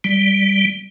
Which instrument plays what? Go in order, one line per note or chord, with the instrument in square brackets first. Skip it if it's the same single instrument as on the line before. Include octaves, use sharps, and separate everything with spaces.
[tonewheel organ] G3